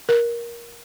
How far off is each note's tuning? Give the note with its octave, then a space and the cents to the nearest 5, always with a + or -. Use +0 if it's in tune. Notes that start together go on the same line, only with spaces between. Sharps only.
A#4 +15